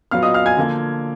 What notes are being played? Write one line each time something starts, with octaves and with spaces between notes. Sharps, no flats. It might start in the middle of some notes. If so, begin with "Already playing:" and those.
A#2 F#3 B3 F5 F6
D#5 D#6
F5 F6
G#5 G#6
D3 F3 A#3